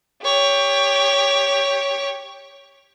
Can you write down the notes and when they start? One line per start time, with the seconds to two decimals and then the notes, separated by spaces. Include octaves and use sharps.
0.23 G4 C#5